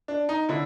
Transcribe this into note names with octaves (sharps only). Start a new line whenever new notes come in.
D4
D#4
D3 E4